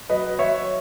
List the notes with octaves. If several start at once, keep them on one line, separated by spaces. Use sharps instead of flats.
F#3 B4 D#5
F#3 C#5 E5